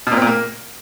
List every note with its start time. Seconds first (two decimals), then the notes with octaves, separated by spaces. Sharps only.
0.07 B2
0.12 A#2
0.17 C4
0.22 A#2
0.27 A#3